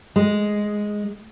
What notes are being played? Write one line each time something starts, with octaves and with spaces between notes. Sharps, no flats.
G#3